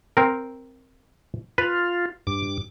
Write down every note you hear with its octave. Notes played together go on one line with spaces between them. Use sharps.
C4 A#4
F4 B4
G2 D6